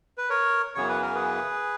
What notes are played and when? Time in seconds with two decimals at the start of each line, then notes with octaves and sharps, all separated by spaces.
0.18 B4
0.30 A#4 C#5
0.75 F#2 C#3 E3 B3 C#5
0.89 B4
1.02 A#4
1.15 G#4 B4